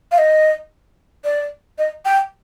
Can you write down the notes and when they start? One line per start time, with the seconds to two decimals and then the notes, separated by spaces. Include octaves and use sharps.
0.12 F5
0.18 D#5
1.25 D5
1.78 D#5
2.05 G5